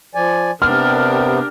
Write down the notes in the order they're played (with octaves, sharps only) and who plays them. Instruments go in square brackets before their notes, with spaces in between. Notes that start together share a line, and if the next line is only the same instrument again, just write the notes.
[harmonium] F3 D5 G#5
[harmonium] C3 B3 [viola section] D4 G4 A#4 [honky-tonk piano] F6